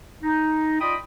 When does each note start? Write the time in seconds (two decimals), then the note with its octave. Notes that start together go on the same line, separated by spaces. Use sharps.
0.23 D#4
0.80 F4 D5 D#5 G5 B5 D#6